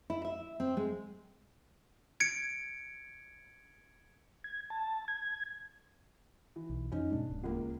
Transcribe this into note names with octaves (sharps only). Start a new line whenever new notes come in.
E4
E5
C4
G#3
G#6 C#7 D7
G#6
A5
G#6
E3
B1
F2 F3 C#4 D#4
G#2 B2 G#3 D4
D1
C#2 A#3